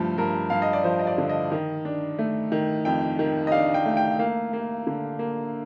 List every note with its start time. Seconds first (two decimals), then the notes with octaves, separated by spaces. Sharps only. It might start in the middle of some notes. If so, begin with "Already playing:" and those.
Already playing: G2 F3 A3
0.18 G2 A#4
0.50 G2 F5
0.62 D#5
0.73 D5
0.84 F3 C5
0.99 D#5
1.07 D5
1.18 D3
1.29 D#5
1.52 D#3
1.85 D4
2.19 A3
2.52 D#3
2.85 F2 G5
3.19 D#3
3.47 D#5
3.52 D4 F5
3.74 G5
3.86 A3
3.97 G5
4.19 A#3 F5
4.53 A#3
4.87 D3
5.19 A#3